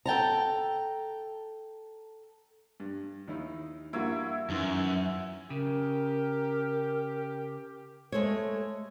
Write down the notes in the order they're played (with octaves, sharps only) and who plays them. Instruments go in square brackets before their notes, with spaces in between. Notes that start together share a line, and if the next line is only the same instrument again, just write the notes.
[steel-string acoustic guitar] A4 G5 A5 A#5
[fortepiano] G2
D#2 D#4 E4
[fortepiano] G2 A#3 F#4 [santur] E4 C#5 E5
[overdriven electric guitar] F#2 [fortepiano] D#3 E3 C6
[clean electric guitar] C#3 [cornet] G4 [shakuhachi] A#4
[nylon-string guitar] G#3 A3 A4 C5 C#5